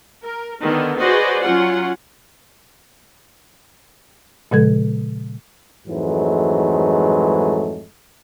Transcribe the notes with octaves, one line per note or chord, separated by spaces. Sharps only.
A#4
D3 D#3 B3
F#4 G#4 B4 C5 D5 D#5
F#3 C#4 F4 F#5
A#2 C#3 F3 G#3 A4 G#6
F2 G#2 E3 F#3 G#3 A3